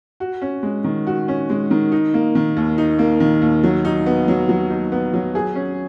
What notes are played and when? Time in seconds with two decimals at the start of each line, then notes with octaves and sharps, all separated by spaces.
0.20 F#4
0.42 C#4
0.63 G#3
0.84 D#3
1.07 F#4
1.28 C#4
1.50 G#3
1.71 D#3
1.92 D#4
2.14 A#3
2.35 D#3
2.57 D#2
2.78 D#4
2.99 A#3
3.20 D#3
3.42 D#2
3.64 F#3
3.85 D#4
4.06 B3
4.28 F#3
4.49 F#3
4.70 D#4
4.92 B3
5.14 F#3
5.35 G#4
5.55 C#4